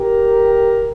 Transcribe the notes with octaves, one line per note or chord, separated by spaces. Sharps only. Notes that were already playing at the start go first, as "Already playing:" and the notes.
Already playing: G4 A#4